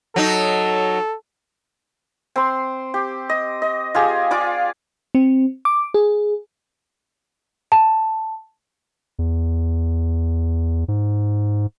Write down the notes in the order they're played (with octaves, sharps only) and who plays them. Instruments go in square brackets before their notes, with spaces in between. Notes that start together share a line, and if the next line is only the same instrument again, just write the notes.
[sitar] F#3 D#4 [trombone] A4
[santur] C4 C6
G4
D#5
D#5
F4 G4 G#4
F4 D5 D6
[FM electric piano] C4
D6
G#4
[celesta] A5
[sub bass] E2
G#2